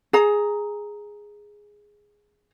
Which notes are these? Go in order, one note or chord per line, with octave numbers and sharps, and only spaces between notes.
G#4 A#5